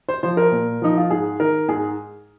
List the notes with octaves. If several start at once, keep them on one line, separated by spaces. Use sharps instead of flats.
C5
F3 C5
A#4
A#2
F3 D#4
F4
G#2 G#4
D#3 A#4
G#2 G#4